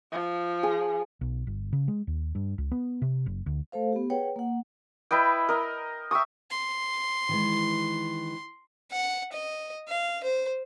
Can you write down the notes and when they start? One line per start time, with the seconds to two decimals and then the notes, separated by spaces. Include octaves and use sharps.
0.12 F3
0.63 G#4
1.21 B1
1.47 G1
1.73 C#3
1.88 G#3
2.07 D#2
2.35 G2
2.58 C#2
2.72 B3
3.02 C3
3.26 F#1
3.46 D2
3.72 A3 A4 C5 F5
3.93 B3 G4
4.10 G#4 B4 C#5 F#5 G5
4.36 A#3 F#5
5.11 E4 B4 D#5 G5
5.49 A#4 D#5
6.11 E5 G5 C#6 D#6
6.51 C6
7.29 D#3 E3 G#3
8.92 F#5
9.33 D#5
9.88 F5
10.24 C5